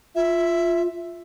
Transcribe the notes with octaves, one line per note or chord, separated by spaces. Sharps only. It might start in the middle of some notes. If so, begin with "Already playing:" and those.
F4 E5